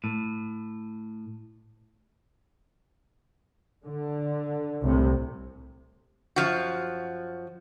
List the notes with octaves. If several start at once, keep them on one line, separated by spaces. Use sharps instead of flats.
A2
D3
C2 A2 C3
F#2 F3 F#4